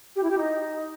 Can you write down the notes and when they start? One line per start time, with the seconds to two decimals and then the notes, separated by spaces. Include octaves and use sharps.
0.16 G4
0.23 E4
0.30 G4
0.37 D#4